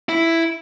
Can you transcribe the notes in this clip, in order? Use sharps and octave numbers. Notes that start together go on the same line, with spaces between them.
E4